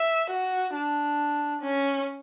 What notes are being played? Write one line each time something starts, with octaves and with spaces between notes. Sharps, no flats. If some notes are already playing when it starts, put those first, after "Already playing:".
Already playing: E5
F#4
D4
C#4